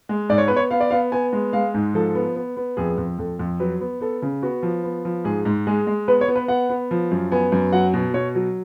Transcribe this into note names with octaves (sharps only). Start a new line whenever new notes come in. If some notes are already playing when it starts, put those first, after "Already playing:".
G#3
G#2 D5
C#5
B3 B4
C#5
B3 F5
D5
B3 F5
B3 G#5
G#3
G#3 F5
G#2
F3 A4
B3
B3
B3
F2 G#4
F2
F2 A4
F2
F#3 B4
B3
B3 A4
C#3
B3 F#4
F3
B3
F3
G#2 G#4
G#2
G#3 G#4
G#3
B3 B4
C#5
B3
B4
B3 F#5
B3
F3
F#2
B3 G#5
F#2
F#3 F#5
B2
B2 C#5
F#3